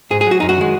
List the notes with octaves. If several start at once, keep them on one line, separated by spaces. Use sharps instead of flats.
G#2 G#4
G#4
F#3 F#4
F#2 D#4
F#4
D#3 G#3